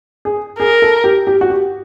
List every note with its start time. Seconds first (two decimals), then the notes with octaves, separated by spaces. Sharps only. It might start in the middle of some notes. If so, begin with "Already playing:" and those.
0.25 G#4
0.59 G#4 A#4
0.82 A4
1.04 G4
1.27 G4
1.41 F#4
1.50 G4